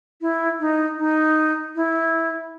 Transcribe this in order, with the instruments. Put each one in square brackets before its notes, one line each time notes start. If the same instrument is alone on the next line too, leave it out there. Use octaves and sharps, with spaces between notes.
[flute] E4
D#4
D#4
E4